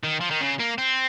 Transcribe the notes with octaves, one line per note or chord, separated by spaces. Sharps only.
D#3
F3
D#3
C#3
A#3
C4